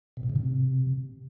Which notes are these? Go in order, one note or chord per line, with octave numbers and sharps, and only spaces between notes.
B2
A2
C#3
C3